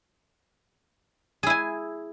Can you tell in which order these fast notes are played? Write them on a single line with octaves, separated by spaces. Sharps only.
G#4 E4 G#5